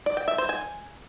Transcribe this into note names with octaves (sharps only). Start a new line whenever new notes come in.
D5
G5
E5
C5
G#5